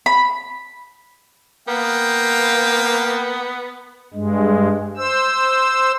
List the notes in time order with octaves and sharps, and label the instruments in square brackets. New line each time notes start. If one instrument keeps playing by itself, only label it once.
[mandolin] B5
[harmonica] A#3 F5 G5 [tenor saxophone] B3
[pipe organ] G2 G#3
C5 E6